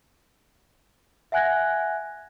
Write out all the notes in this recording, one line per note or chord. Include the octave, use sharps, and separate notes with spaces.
E5 F#5 G#5 F#6 G#6 A#6